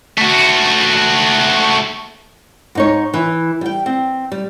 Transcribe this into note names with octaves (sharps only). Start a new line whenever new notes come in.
A3 F#4
G#2 D#4 C#5
E3
G3 G5
C4
G3